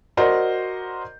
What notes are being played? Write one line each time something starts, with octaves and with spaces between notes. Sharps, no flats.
F#4 A#4 C5 D5 D#5